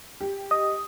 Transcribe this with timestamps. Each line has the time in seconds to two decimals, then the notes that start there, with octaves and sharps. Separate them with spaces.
0.21 G4
0.51 D#5 D#6